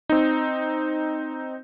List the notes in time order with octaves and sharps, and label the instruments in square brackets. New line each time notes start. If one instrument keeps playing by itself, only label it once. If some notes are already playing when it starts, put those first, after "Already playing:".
[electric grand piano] C4 D#4